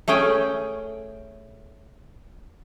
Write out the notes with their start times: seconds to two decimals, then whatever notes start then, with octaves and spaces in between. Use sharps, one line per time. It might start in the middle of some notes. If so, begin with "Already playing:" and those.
0.08 A3 C#4 G#4 G5 G#5